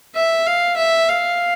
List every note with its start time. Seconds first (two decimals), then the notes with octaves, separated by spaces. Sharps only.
0.15 E5
0.46 F5
0.77 E5
1.09 F5